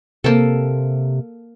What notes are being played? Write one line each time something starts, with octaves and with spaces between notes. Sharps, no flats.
C3 A#3 A4